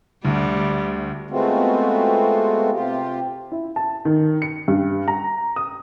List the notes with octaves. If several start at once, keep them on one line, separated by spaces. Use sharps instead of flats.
D2 G3
G#3 A3 B3 C4 F4 F#4
C3 F4 G4
E4
A5
D#3
C#7
G2
A#5
D#6